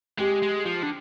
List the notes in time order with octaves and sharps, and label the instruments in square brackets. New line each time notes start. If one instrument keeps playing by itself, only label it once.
[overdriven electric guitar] G#3 [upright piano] G4
[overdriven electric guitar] G#3
F3
D3